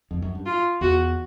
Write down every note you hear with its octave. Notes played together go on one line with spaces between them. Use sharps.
F2
F#2
G2
F4
E2 F#4